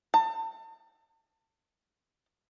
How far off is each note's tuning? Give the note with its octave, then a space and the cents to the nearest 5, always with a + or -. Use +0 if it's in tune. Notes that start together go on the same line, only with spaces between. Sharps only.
A5 +35